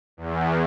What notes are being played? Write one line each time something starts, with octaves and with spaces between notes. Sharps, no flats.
E2